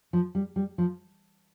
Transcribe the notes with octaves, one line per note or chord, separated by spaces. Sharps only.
F3
G3
G3
F3